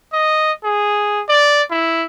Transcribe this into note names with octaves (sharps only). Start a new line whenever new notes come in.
D#5
G#4
D5
E4